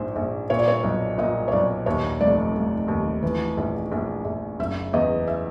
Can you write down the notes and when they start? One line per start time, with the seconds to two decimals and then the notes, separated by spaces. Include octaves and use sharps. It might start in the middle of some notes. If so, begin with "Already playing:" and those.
Already playing: A#1 G#2 C5
0.16 A#1
0.50 A#2 C#5
0.59 D5
0.68 C#5
0.84 B1
1.18 A#2 D#5
1.48 C#5
1.52 B1 D5
1.86 D#2 C#5
2.20 F1 D5
2.55 F1
2.88 D#2
3.23 E3
3.57 A#1
3.92 A#1
4.25 A#1
4.59 F#1 E5
4.93 E2 D#5
5.28 E5